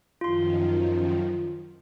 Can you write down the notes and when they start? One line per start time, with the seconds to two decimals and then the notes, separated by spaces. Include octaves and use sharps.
0.21 F#2 D#3 F3 F4 C6